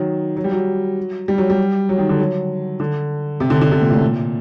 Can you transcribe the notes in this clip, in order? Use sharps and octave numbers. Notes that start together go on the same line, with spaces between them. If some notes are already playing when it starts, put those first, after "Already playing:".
Already playing: D#3 F#3
F#3
G3
F#3
G3
F#3
G3
F#3
D#3
D3
F#3
D3
C3
D3
D3
C3
A#2
A2
A#2